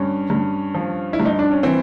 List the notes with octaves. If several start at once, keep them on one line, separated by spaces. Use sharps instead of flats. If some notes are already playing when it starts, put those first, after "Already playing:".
Already playing: G2 C#4
G2
F3
E4
G2
D#4
D4
C#4
E3 C4